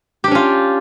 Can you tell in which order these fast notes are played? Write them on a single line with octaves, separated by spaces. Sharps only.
G4 D4 C#4 F4